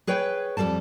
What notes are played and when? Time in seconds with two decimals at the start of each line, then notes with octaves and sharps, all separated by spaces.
0.07 G#4 B4 C#5 G5
0.57 F2 G#2 G3 A4 A5